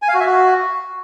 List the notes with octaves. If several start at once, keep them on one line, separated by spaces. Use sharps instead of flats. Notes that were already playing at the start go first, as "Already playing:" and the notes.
G#5
F5
F#4
E5
F#4